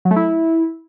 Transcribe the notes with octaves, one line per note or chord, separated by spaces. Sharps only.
F#3
A3
E4